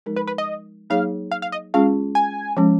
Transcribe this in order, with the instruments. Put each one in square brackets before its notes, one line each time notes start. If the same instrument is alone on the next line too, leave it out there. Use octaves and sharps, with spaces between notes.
[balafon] F3 G#3 D#4 A#4
[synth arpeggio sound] B4
B4
D#5
[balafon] F#3 A#3 D#4 G#4 C#5 [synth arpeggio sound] F5
[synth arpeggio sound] F5
F5
D#5
[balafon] G#3 C#4 F4 G#4 [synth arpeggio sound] F5
[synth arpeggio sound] G#5
[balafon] F3 G#3 C#4